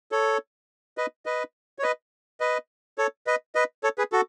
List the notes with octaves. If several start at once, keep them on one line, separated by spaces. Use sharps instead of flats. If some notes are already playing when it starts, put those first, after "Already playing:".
A4 C#5
B4 D#5
B4 D#5
C#5
B4 D#5
B4 D#5
A4 C#5
B4 D#5
B4 D#5
A4 C#5
G#4 B4
F#4 A4